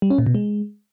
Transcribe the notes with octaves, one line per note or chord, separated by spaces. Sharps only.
G3
C#4
A#2
B2
G#3